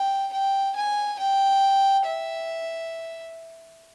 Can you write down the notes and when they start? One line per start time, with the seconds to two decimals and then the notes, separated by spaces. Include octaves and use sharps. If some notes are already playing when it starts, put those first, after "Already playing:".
Already playing: G5
0.33 G5
0.76 G#5
1.19 G5
2.06 E5